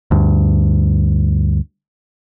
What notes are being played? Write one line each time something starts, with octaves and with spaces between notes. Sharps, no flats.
D2 G2